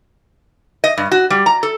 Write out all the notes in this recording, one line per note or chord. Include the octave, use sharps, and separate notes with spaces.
D#5
G2
F#4
G3
A#5
A4